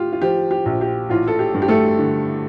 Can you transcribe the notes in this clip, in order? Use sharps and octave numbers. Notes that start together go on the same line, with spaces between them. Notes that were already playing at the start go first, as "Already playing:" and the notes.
Already playing: A2 F4 G4
F4
F3 G4
G4
A#1
G4
A1 F4
A4
G4
G2
G4
A3 A4
D3